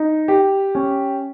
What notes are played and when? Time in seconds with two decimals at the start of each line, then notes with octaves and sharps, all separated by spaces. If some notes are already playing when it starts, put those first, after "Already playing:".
Already playing: D#4
0.28 G4
0.75 C#4